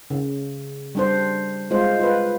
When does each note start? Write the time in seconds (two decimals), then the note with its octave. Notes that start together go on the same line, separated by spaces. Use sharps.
0.10 C#3
0.95 G3 D4 C5
1.71 G#3 F4 C5
1.99 F4 B4